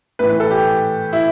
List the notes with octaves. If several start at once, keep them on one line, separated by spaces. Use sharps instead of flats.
A2 E3 B4
B4
A4
G4
E4